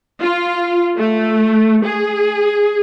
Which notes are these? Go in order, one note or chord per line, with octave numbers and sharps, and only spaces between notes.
F4
A3
G#4